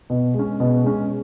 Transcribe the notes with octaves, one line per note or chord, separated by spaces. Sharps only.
B2
G#3 C#4
B2
G#3 C#4